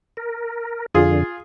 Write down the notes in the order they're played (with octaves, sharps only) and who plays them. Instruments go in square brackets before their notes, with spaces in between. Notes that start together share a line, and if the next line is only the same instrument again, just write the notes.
[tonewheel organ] A#4
[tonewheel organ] F2 D3 [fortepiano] F4 G#4